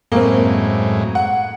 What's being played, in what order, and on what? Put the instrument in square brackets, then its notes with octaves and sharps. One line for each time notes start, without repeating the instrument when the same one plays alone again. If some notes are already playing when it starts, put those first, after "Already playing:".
[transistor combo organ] F#2 A2 G#3 [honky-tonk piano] A#3 C4
[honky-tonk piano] F#5